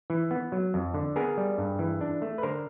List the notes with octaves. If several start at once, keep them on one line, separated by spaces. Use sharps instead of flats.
E3
B3
F#3
F2
D3
B3 G#4 A#4
G3
G2
E3
D4
A3
B4
D3 A#4 C5